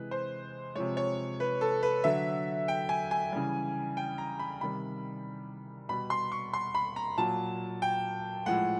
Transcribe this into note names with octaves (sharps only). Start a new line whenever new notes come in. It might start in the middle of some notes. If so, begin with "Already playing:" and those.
Already playing: C3 E3 G#3 B4
C5
C3 F3 G#3 C#5
C#5
B4
A4
B4
D3 F#3 E5
G5
G#5
G#5
C#3 E3 G3
G5
A#5
B5
C3 D#3 G3 B5
B2 G3 B5
C6
C#6
C6
B5
A#5
A#2 F#3 A5
G5
A2 F3 G#3 F#5